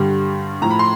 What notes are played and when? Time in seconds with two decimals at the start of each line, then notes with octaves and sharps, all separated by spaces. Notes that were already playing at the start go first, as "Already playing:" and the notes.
Already playing: G2 D3 G3
0.62 A2 F3 A3 A#5
0.71 B5
0.79 C6